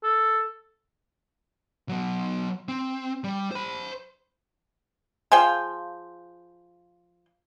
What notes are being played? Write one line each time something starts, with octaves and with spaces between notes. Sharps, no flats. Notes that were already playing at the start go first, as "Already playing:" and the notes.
A4
F#3 B3
C4
G3
C5 B5
F3 G#4 F5 G5